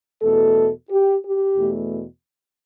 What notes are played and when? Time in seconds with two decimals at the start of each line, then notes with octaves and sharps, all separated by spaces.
0.22 E2 B2 A3 A4
0.89 G4
1.23 G4
1.56 E2 B2 A3